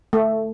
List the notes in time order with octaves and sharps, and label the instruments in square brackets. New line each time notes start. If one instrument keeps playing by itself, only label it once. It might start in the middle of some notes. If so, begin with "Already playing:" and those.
[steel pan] A3